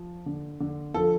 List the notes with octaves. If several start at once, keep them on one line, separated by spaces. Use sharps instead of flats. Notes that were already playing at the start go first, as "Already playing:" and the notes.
Already playing: F3
D3
D3
F3 A4